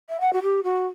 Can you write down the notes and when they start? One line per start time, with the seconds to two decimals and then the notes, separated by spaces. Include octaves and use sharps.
0.09 E5
0.20 F#5
0.33 F#4
0.42 G4
0.63 F#4